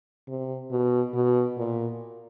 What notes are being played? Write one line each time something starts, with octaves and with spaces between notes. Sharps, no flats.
C3
B2
B2
A#2